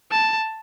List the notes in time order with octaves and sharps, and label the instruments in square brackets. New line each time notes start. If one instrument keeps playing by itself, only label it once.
[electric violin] A5